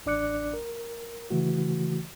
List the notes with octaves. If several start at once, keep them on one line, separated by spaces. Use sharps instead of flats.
A1 D4 D5 D6 F#6 C#7
A#4
C#3 E3 A3 F#4